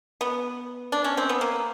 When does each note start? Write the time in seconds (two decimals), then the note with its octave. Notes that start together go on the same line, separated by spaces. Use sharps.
0.21 B3
0.92 D4
1.04 C#4
1.17 C4
1.29 B3
1.41 A#3